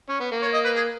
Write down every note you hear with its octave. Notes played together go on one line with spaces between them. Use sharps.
C#4
B3
A#3
C#5
D#5
B4
G#4